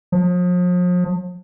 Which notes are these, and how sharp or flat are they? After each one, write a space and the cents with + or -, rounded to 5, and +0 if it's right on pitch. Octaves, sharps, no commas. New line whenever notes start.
F3 +40